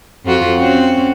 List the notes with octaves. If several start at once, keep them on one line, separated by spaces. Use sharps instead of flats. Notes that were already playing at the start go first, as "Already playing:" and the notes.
F2 F4 F#4
C4 C#4 F#4